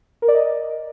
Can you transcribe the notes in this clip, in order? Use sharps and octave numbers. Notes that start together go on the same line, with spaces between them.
A#4
D5
D#5